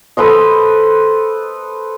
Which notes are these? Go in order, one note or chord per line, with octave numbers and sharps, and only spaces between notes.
A4 B4 C5 D#5